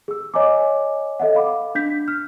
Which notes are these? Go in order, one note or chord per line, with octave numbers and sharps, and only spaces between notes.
G#4 E6
C#5 D#5 G#5 A#5 D6
A4 D#5 E5 F#5
F5 B5 D6
D4 G6 B6
F6